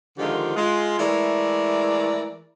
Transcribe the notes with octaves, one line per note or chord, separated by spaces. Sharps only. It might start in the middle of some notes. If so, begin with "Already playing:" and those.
D3 D#3 F3 G#3 F4 G4
G#3 F4
E3 G#3 A3 A#4 D5